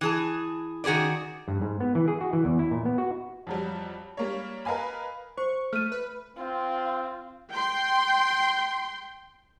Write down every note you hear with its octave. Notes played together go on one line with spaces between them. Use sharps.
E3 G#4 A5
D#3 F#4 G#4 B4 D5
G2
G#2
B3
E3
G#4
F#4
E3
E2
E4
A#2
B3
F#4
F2 F#3 G3
G3 A#3 C#5
A#4 B4 D#5 F5 G#5 B5
C5 C#6
A3 F6 D#7
B4
C4 F4
G5 C6